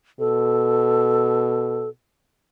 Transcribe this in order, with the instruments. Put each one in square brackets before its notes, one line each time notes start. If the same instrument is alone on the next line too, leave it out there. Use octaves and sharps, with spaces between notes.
[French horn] B2 [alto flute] A4